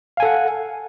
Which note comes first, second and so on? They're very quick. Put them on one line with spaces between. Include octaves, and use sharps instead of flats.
F5 G#5 A4 F#5